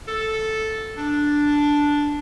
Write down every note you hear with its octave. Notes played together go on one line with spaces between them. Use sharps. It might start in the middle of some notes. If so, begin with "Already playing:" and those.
A4
D4